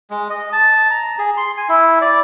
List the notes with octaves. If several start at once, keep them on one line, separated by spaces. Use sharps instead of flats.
G#3
D#5
A5
A#5
G#4
C6
G#5
E4
D5